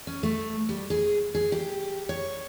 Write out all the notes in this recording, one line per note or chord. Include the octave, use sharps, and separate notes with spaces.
C#4
A3
G3
G#4
G#4
G4
C#5